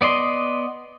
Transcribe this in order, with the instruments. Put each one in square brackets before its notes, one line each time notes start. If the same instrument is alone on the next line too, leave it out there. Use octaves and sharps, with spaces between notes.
[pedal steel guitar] B3 D5 D#5 C6